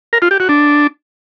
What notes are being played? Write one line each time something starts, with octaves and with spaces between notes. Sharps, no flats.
A#4
F4
G4
F#4
D4